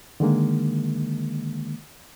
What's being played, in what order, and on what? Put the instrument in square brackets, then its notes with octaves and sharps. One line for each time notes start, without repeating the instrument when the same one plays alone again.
[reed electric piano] D3 D#3 G#3 A#3